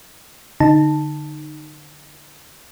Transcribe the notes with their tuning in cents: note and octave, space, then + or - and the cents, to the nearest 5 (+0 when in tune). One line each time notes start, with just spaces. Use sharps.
D3 +0 D#4 -10 A5 +0